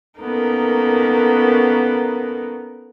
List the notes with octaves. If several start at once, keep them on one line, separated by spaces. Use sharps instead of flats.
A#3 B3 C#4 D#4 A4 A#4